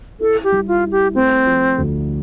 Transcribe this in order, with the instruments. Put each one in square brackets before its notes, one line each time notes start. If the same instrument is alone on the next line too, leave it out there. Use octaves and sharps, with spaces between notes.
[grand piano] E4 [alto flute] A4
[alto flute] G4
[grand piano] G3
[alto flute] F4
[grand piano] E4
[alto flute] G4
[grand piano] A3 [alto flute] C4
[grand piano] F3
D2